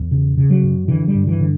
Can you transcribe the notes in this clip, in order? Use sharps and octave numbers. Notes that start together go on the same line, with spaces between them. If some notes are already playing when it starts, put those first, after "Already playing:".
Already playing: E2
C#3
C#3
F#3
F#2
D3 E3
G3
G2
E3
D3